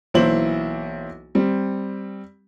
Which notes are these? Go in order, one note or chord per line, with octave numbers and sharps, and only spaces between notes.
B1 E3 A#3 E4 C5 F#7
G3 C4